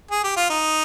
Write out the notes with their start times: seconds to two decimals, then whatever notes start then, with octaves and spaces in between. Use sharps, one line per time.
0.11 G#4
0.24 G4
0.37 F4
0.50 D#4